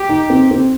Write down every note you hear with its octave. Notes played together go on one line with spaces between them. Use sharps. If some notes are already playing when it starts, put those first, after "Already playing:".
Already playing: G4
D#4
C4
C4